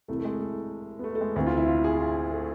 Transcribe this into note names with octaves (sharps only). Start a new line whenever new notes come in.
C2 C3 E3 A3
A3
G#3
A3
B3
A3
A3
G#3
D2 C3 E3
F4
E4
F4
G#4
F4
A3